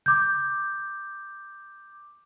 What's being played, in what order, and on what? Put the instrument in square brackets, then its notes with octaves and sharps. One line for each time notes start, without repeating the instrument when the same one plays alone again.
[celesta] D6 G6